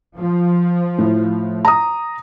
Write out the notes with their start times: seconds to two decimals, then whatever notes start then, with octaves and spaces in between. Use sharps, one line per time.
0.17 F3
0.99 A2
1.65 A#5 D#6